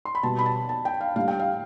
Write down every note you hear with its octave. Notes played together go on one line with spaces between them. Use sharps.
C6
B5
B2 G3 B3 A5
B5
A5
A5
G5
F5
A2 G3 D4 F5
G5
F5